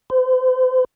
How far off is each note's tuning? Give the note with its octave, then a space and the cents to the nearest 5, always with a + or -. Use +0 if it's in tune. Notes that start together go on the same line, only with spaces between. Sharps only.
C5 -40